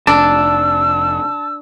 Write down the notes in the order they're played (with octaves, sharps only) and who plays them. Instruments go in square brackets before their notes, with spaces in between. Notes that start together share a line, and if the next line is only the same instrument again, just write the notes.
[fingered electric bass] F1 [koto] D4 [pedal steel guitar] A5 [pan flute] E6